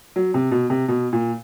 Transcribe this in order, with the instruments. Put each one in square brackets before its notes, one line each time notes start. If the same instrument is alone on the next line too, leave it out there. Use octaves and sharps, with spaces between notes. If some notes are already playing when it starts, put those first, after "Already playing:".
[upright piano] F#3
C3
B2
C3
B2
A#2